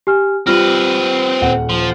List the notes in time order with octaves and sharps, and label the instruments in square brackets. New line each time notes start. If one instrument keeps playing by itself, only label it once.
[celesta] G4 G#5 F6
[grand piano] G3 [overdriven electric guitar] C4 B4 [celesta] F4 F6 A#6
[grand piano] D#1 F#5
[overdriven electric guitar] F3